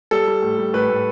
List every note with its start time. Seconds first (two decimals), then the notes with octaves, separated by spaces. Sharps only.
0.11 G3 A4
0.27 G3
0.42 A2
0.58 G3
0.73 A2 B4
0.89 A2